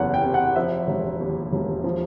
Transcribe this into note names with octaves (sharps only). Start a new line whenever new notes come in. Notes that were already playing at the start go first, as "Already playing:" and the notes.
Already playing: F#1 E2 F#5
G5
C3
F#5
F3 E5
E1
D#2
E1
F3